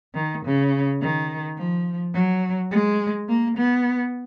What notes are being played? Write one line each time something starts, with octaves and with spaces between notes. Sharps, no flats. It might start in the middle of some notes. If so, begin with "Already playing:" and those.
D#3
C#3
D#3
F3
F#3
G#3
A#3
B3